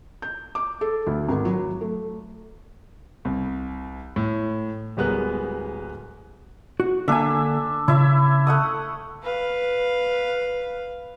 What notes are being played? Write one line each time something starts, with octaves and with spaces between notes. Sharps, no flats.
G6
D6
A4
D2
G#1
F#3
A3
C2
A2
D1 G3 G#3 B3 A#4 F#6
F#4
D3 A#3 D4 E5 G#5
C#3 E4 E5
A3 F#5 D#6
B4 F5